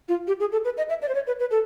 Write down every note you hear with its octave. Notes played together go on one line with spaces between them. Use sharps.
F4
G4
G#4
A4
B4
D#5
E5
D5
C5
C#5
B4
B4
A4